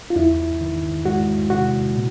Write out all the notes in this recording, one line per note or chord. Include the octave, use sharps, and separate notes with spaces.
F4
E2 E4
D#3
G#3 F#4
C3 F#4
A#2